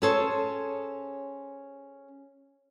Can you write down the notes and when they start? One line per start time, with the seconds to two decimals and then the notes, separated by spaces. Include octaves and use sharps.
0.02 C#4 G#4 A4 C5 C#5